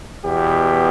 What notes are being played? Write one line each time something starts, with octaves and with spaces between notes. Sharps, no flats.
E2 B2 G4